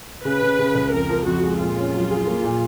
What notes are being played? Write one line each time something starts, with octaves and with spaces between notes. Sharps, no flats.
C#3 B4
C#3
C#3
C#2
F2 A#4
F3
F2 F#4
G#3
A#2 F4
C#4
F#3
G#4
A#3
A#2